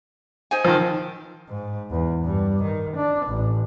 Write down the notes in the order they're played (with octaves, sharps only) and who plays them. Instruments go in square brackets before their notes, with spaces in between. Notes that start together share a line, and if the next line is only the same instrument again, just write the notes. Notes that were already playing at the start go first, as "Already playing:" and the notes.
[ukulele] D#4 C5 G#5
[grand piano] D#3 F3
[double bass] G#2
E2
G2
D#3
D4
A1